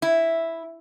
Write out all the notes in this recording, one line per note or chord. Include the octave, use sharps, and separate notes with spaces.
E4